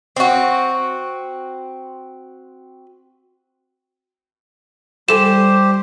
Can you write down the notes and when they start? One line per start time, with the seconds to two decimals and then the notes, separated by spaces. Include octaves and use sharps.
0.16 C4 F#4
5.09 G3 E4 G4 A4 C5 G#5 E7